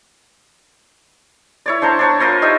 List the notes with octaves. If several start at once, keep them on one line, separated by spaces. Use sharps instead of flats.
E4 C#5 D5
D4 C5 A5 A#5
D4 C#5 A5
F4 A#4 C5 C#5
D#4 G4 D5 E5